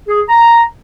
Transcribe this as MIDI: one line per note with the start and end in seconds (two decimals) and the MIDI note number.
0.07 0.21 68
0.29 0.61 82